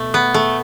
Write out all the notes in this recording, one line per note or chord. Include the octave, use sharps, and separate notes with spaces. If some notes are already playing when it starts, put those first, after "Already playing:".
Already playing: B2 A3
B3
A3